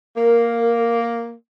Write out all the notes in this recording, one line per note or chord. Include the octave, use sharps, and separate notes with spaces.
A#3 A#4